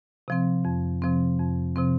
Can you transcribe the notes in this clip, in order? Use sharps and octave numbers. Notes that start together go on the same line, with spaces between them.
C3 F3 C4
F2
C3 F3 C4
F2
C3 F3 C4